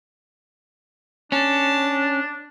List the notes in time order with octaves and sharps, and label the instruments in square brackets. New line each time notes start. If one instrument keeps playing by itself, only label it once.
[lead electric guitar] C#4 [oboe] D4 [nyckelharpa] A5